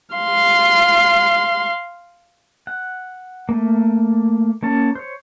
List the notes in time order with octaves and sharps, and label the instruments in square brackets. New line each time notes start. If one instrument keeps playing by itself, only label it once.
[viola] F5 C6
[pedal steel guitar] F#5
A3 A#3
A#3 C#4 A5
C5 C#5